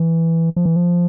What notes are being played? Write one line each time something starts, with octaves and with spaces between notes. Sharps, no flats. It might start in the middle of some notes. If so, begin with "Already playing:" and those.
Already playing: E3
F3
E3
F3